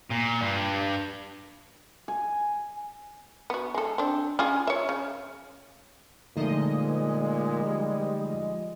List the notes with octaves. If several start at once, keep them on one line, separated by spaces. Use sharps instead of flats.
A#2
G2
G#5
B3 F#4
G#3 A4
C4 D4
C#4 F4 G#4
C#5 E5
C#3
A#2 D3 F3 G#3 A3 D#4 D#5
G3